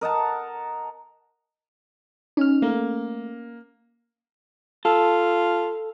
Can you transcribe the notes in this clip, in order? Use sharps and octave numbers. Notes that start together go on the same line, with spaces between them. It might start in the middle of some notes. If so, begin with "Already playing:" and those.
A#4 D#5 F#5 A5
C#4 D#4 F6
A3 A#3
F4 A4